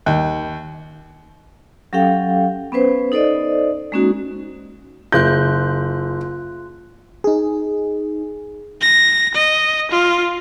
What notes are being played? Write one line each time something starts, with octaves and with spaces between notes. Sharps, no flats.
D#2
F#3 C#4 G4 A4 F5 G5
B3 C#4 B4 C5
D#4 A4 C5 D5 D#5
G#3 A#3 C#4 D#4 F#4
F#1 F4 F#6 G6
D#4 G#4
A#6
D#5
F4